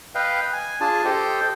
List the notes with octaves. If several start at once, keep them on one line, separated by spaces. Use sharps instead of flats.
B4 D#5 F5 G5
G#5
D4 F4 G#4 G#5 A5
G4 A4 C5 D#5 G5